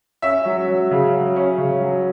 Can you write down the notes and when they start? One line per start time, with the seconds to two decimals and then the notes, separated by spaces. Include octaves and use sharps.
0.22 C#4 E5
0.45 F#3
0.68 F#3
0.91 C#3
1.13 F#3
1.36 C#4
1.58 C#3
1.81 F#3